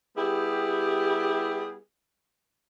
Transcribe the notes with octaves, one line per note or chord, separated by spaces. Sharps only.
G3 B3 E4 G4 G#4